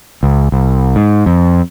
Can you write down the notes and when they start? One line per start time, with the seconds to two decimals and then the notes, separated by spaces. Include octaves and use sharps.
0.23 C#2
0.52 C2
0.96 G#2
1.26 F2